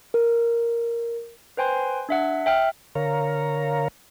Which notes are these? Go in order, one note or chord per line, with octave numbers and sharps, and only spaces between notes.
A#4
B4 C5 G5 G#5 C6
D4 E5 F#5
E5 G5 F6
D3 A#4 C#5 F5 A#5